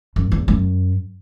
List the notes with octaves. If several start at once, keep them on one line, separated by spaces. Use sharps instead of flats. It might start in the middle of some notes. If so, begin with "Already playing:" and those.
F#2
E2
F#2